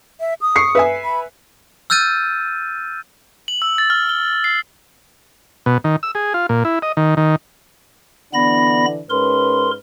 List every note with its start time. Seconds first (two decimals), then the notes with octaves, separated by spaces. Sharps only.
0.20 E5
0.41 D#6
0.56 C#6 C7 C#7
0.75 B4 E5 G#5
1.04 B5
1.90 E6 F6 G6 A6 D#7
3.48 F#7
3.62 E6
3.78 A6
3.90 F6
4.09 G7
4.44 C7
5.66 B2
5.84 D#3
6.03 E6
6.15 G#4
6.34 F4
6.49 A#2
6.65 E4
6.82 D#5
6.97 D#3
7.17 D#3
8.34 D3 E3 B3 D4 B5 A#6
9.10 G#2 C#4 A#4 B4 C6